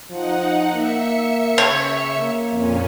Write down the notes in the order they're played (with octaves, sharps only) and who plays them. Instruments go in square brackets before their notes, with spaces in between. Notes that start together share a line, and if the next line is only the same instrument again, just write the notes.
[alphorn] F3 [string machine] D#4 F#5
[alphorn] A#3 [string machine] E5 C#7
[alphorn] C#3 [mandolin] C#5
[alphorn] A#3
[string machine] F2 A#2 C#4